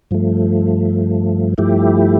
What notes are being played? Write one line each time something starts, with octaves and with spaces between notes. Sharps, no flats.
G2 F3 A3
G2 F3 A3 E4 G4